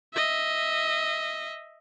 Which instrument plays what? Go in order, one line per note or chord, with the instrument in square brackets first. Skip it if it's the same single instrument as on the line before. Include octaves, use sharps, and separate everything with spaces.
[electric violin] D#5 E5